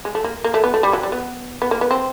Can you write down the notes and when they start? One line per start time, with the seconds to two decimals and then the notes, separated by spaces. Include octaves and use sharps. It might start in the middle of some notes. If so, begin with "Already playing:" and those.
0.05 G#3
0.15 A3
0.24 A#3
0.44 A#3
0.54 A3
0.64 B3
0.74 A3
0.83 G3
0.93 F#3
1.03 G3
1.12 B3
1.62 B3
1.71 A#3
1.81 B3
1.91 C4